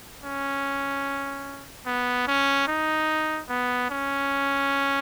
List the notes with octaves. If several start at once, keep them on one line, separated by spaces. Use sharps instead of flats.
C#4
B3
C#4
D#4
B3
C#4